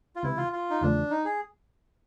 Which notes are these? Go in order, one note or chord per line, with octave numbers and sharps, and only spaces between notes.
F4
C#2 C3 E3 E4
F4
F4
D#4
E2 C#3 F3 A3 D4
D#4
G#4